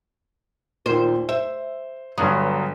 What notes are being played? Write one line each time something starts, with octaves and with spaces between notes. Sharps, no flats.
D#2 A#2 C5
C5 E5
G1 G2 F#3 D#6